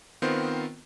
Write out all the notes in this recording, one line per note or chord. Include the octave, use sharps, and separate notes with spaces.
D#3 B3 C4 F4 A#4 C5